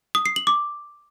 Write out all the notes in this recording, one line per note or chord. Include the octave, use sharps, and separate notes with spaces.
D#6
C7
F#7
D6